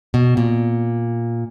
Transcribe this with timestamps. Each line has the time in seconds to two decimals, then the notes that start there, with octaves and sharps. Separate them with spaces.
0.14 B2
0.37 A#2